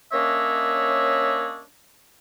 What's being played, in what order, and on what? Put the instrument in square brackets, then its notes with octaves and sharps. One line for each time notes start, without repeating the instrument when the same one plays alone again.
[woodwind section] A#3 C#4 D4 C#5 D#5 E5